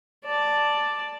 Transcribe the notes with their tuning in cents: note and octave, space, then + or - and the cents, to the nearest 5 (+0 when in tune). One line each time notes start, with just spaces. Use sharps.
D5 +0 A5 +0